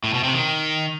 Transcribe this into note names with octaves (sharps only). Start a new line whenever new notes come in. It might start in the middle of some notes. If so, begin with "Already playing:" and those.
A2
B2
C3
D#3